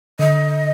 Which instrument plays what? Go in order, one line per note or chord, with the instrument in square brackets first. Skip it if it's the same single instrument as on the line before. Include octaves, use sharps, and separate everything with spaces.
[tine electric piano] D3 [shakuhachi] D#5